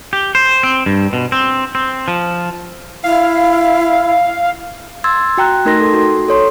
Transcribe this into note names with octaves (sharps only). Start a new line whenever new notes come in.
G4
C5
C4
G2
B2
C4
C4
F3
E4 F5
C6 E6 G#6 A6
F#4 G5 A#5 F#6
A3 D#4 A#4 C6 A#6
A4 C6
F#4
A4 C#5 C6